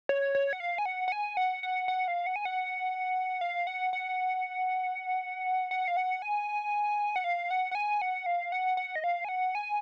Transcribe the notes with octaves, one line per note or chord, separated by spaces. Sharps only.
C#5
C#5
F#5
F5
G#5
F#5
F#5
G#5
F#5
F#5
F#5
F5
F#5
G#5
F#5
F5
F#5
F#5
F#5
F5
F#5
G#5
F#5
F5
F#5
F#5
G#5
F#5
F5
F#5
F#5
D#5
F5
G#5
F#5
G#5